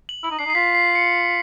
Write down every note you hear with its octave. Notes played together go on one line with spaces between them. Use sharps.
F#7
E4 F#7
D#4
D4 C7
D#4
C7
F4 B6
C7
C#7